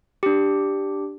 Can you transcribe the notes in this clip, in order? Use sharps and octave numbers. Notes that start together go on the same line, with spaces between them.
D4 G4